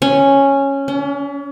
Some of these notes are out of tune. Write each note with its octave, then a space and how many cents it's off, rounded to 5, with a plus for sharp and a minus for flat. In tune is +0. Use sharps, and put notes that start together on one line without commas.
C#4 -5
C#4 +40